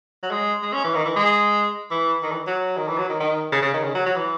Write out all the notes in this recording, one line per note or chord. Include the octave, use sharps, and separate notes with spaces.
F#3
G#3
G#3
C#4
E3
D#3
E3
G#3
E3
D#3
E3
F#3
D#3
E3
F#3
D#3
D#3
C#3
C#3
D#3
C#3
F#3
F#3
E3